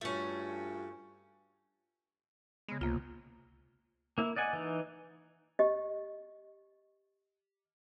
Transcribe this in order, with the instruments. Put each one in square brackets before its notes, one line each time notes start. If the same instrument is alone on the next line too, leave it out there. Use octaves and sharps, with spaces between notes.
[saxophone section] G2 [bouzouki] A3 C#4 [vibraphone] F4 F#4
[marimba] C#3 B3 [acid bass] G#3
[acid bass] C#2 [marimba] C3 A#3 F4
[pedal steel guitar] A#3 E4
D5 D#5 F#5 G#5
E3 D#4
[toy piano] G4 D#5